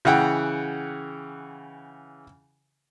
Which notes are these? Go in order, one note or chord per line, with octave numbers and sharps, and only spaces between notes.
C#3 E3 F#5 G5